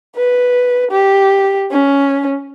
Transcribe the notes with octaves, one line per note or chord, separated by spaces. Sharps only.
B4
G4
C#4